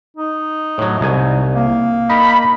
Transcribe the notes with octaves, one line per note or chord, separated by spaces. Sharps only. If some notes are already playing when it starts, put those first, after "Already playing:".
D#4
A2 F#3
C2 G#5
A#3
D#4 A#4 B5